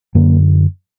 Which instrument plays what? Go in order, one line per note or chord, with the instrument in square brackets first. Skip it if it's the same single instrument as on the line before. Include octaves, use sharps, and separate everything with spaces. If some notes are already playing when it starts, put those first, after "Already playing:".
[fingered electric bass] F#2 D3 A#3